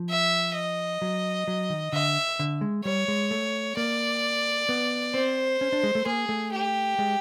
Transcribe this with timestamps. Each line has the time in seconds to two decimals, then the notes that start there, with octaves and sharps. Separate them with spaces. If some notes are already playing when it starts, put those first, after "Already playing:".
Already playing: F3
0.10 E5
0.55 D#5
1.02 F#3
1.48 F#3
1.70 D#3
1.93 D3 E5
2.39 D3
2.61 G#3
2.85 G3 C#5
3.08 G#3
3.31 A3
3.77 A#3 D5
4.69 B3
5.14 C4 C5
5.61 C#4
5.72 D4
5.83 G#3
5.95 A3
6.06 A#3 G#4
6.29 A3
6.52 G4
6.99 G#3